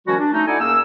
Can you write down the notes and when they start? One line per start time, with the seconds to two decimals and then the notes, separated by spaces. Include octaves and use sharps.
0.07 D#3 F3 G3 A3 C#4 F#4
0.19 D4
0.32 A3 C#4 D#4
0.47 D#4 E4 A4 D5 F#5 G#5
0.60 F#2 A#3 G#4 E6